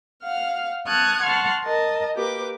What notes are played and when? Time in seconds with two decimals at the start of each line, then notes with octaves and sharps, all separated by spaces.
0.23 F5 F#5 F6
0.87 A5 C#6 D#6 F6 F#6 G#6
1.23 F#5 A5 C6 C#6 F6
1.64 A#4 D#5 A5
2.16 A#3 G4 B4 D6